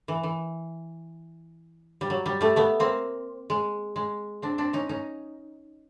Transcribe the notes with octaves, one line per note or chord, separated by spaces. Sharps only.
E3
E3
G3
F#3
G3
G3 A3
A3 B3
A#3 C4
G#3
G#3
C4 D4
C4 D4
C#4 D#4
C#4 D#4